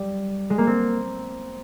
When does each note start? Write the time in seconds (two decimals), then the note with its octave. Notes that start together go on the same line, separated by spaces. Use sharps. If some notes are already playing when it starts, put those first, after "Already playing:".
Already playing: G3
0.50 G#3
0.58 A#3
0.67 C4